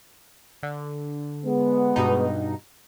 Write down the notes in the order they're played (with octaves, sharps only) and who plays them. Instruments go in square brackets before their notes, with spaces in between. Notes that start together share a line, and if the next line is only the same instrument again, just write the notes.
[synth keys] D3
[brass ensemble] G#3 B3
[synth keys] G2 B2 D#4